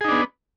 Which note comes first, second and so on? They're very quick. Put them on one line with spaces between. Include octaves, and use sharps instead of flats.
G#4 D#4 D4 B3